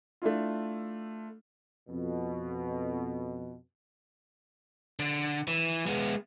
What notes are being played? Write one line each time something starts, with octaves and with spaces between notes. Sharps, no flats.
A3 D4 E4 F4
F2 B2
D3
E3
G#3 B3